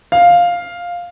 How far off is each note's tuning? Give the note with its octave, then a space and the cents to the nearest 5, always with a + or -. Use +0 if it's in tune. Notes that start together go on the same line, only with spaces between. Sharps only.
F5 +5